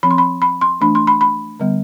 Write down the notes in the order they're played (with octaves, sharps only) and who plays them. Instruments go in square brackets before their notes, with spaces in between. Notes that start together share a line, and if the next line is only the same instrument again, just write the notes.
[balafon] F3 C4 B5
C6
B5
B5
C6
E3 A3 D4 B5
C6
B5
B5
D3 G3 B3